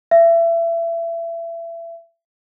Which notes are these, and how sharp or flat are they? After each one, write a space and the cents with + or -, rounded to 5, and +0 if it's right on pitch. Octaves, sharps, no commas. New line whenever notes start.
E5 +30